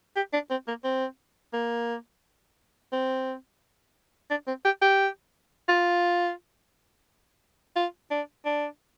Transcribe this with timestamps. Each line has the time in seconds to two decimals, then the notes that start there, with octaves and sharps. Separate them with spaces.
0.16 G4
0.33 D4
0.50 C4
0.68 A#3
0.84 C4
1.54 A#3
2.92 C4
4.30 D4
4.47 C4
4.65 G4
4.82 G4
5.69 F4
7.76 F4
8.11 D4
8.45 D4